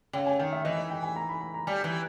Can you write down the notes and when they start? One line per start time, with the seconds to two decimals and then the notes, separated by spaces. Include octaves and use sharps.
0.13 C#3 G5
0.26 G#5
0.39 D#3 G5
0.52 E5
0.65 E3 D#5
0.78 D#5
0.90 G5
1.03 G#5
1.16 A#5
1.29 B5
1.41 B5
1.54 A#5
1.67 G3 G#5
1.84 E3